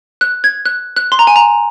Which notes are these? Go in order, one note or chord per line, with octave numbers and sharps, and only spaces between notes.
F#6
G#6
F#6
F#6
C6
A#5
G#5
A#5